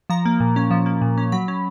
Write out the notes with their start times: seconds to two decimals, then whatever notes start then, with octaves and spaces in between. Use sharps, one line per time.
0.10 F3 A#5
0.25 A#3
0.40 A#2
0.56 C#4
0.71 F3
0.86 A#3
1.01 A#2
1.18 C#4
1.32 F#3 B5
1.48 C#4